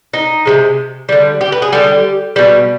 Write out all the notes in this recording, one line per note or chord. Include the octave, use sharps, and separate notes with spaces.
D#4
C3 F3 G#3
D3 G3
G4
B4
G#4
D3 G3 G4
B2 G3